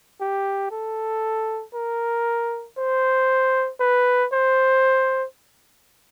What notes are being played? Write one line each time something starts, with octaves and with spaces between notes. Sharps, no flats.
G4
A4
A#4
C5
B4
C5